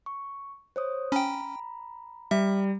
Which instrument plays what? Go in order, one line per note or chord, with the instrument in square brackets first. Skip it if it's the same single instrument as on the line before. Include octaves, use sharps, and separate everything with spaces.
[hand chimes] C#6
C5 C#5 D#6
[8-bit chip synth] C#4 G5 [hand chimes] A#5 B5
[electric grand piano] G3 [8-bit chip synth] E5